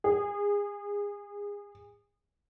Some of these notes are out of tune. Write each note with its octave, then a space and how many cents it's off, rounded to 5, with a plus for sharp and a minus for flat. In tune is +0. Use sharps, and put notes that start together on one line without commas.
G#4 -25